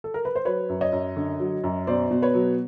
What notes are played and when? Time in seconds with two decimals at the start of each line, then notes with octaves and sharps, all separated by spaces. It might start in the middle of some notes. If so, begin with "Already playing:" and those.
0.04 A4
0.14 A#4
0.25 B4
0.36 C5
0.45 F#3 B4 C#5
0.69 F#2
0.81 C#5 D#5
0.92 F#2
1.17 D3
1.40 F#3
1.64 F#2
1.87 B2 C5 D5
2.11 B2
2.22 B4 C#5
2.34 F#3